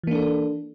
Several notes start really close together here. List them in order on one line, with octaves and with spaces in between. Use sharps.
E3 A#3 D4 A4